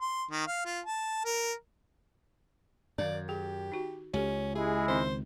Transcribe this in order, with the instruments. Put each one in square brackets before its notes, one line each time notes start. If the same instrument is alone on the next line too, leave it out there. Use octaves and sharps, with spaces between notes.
[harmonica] C6
D#3
F5
F4
A5
A#4
[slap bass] F#2 [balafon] D#3 F5 [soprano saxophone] D5
[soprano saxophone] G4 [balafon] G#4
[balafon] D#4 F#4
[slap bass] C#2 [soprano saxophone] C#4 [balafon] G4 A4
[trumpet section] G#3 E4 [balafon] G4 [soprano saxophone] G#4
[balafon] D#3 C4 D#4 [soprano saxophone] C5